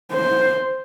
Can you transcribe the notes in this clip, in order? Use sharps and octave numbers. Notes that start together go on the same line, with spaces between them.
C5